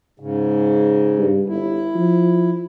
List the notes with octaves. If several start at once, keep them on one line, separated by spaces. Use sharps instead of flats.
G#2 C#3
G2
G1 E4
F3